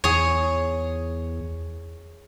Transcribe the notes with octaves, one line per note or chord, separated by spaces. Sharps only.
E2 G#4 C#5